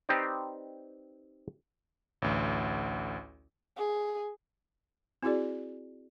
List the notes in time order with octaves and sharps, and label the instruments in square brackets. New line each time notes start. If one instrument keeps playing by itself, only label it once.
[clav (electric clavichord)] C4 D#4 G4 B4 C5 D5
[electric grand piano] A1 D2
[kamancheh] G#4
[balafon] C4 E4 F#4 G#4 D5